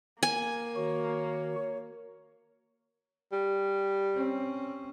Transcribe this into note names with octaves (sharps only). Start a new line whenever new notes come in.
A#3 G#5
D#3 F#4 C#5
G3
C4 C#4